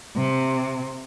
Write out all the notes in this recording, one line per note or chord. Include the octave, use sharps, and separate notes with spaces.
C3